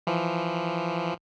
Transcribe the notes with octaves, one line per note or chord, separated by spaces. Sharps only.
E3 F3